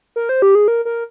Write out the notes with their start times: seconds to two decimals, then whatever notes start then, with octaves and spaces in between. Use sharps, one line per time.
0.16 A#4
0.29 C5
0.42 G4
0.55 G#4
0.68 A#4
0.85 A#4